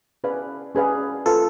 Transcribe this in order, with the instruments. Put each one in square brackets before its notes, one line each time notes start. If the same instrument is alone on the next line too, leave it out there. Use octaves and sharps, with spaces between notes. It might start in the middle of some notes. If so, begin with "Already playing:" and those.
[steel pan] C#4 G#4 B4 D5 F5
C#4 G#4 B4 D5 F5
[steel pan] F4 B4 F5 [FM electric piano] A4